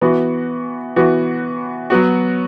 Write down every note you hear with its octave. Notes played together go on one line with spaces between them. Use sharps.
E3 B3 F#4
E3 B3 F#4
F#3 B3 F#4